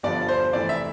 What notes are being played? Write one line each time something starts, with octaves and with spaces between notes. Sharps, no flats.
G1 G2 F3 D5
C5
F1 F2 E3 D5
E5